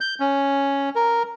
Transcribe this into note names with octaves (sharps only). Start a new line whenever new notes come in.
G6
C#4
A#4